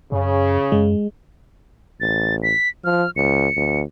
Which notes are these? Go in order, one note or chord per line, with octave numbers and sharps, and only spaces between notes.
F#2 C#3
F#2 G#3
A1 A6
B6
F3 F6
C#2 C#7
D2